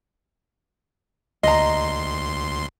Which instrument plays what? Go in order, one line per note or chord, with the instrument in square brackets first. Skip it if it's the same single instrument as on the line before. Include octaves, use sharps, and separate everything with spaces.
[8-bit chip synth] D2 C6 [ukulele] D#5 A#5